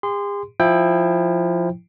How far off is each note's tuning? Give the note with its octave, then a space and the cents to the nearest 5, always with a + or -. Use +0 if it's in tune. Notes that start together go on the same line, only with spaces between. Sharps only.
G#4 -45 C6 -20
F3 +0 E4 +0 G5 +20